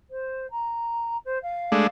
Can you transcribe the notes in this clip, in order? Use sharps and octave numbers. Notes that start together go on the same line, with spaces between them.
C5
A#5
C5
F5
G#3 A3 D4